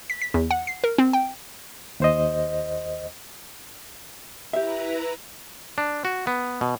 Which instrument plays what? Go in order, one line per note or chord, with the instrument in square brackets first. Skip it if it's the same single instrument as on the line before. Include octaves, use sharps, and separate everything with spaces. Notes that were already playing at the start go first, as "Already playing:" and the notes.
[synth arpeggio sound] B6
B6
E2
F#5
C7
A#4
C4
G5
[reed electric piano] D#2 C5 D#5
[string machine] E4 B4 A#5 [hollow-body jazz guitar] G4 E5
[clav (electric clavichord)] D4
F#4
B3
B2